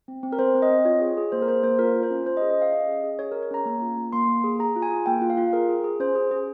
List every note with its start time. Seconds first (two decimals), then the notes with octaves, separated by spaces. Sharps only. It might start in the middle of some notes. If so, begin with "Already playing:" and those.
0.08 C4
0.23 C4
0.33 A#4
0.39 C4 C5
0.55 C4
0.62 D#5
0.70 C4
0.85 F4 C#5
1.01 G#4
1.17 G#4
1.32 A#3 C5
1.42 A#4
1.48 G#4 C5
1.63 A#3 C5
1.79 F4 A#4
1.95 F4
2.03 C5
2.11 C#4
2.26 C#4 C5
2.37 D#5
2.41 G#4
2.50 D#5
2.58 C#4 F5
2.73 C#4 D#5
2.88 G#4
3.03 G#4
3.19 G#4 C#5
3.32 A#4
3.35 G#4
3.43 C#5
3.51 C#4 A#5
3.66 A#3 A#5
3.82 F4
3.97 A#3
4.13 A#3 C6
4.28 A#3
4.44 G#4
4.59 G#4 A#5
4.76 F4
4.82 G#5
4.91 G#4
5.06 A#3 G5
5.22 F4
5.30 F5
5.37 F4
5.53 G#4 A#4
5.69 G#4
5.84 G#4
6.00 C#4 C5
6.15 G#4
6.31 G#4